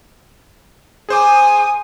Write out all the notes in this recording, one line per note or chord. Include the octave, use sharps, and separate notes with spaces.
G#4 C5 G#5 D6 D#6